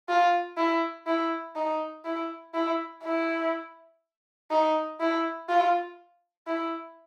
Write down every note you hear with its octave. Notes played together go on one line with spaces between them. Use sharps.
F4
E4
E4
D#4
E4
E4
E4
D#4
E4
F4
E4